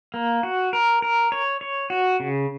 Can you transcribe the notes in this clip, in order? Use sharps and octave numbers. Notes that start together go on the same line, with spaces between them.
A#3
F#4
A#4
A#4
C#5
C#5
F#4
C#3